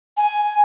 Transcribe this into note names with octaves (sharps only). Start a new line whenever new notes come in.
G#5